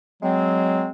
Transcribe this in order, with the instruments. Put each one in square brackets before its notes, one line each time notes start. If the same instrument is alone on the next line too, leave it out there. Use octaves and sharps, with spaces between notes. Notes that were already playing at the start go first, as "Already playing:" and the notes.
[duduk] F#3 [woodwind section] G#3 C4